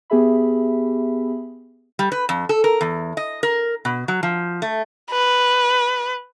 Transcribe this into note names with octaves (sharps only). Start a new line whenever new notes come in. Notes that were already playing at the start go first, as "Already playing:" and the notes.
B3 G4 G#4 E5 B5
G3
B4
F2
A4
A#4
E2
D#5
A#4
B2
F#3
F3
A3
B4